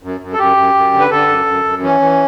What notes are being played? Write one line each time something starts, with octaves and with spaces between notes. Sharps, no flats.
F#2
F#2
A4
F#2 G4
F#2
F#2
D3
B4
D3 A4
F#2
F#2
F#2
E3 C#4
E3